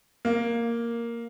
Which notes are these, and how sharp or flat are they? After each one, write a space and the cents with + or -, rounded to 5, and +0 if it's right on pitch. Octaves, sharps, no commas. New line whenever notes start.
A#3 +0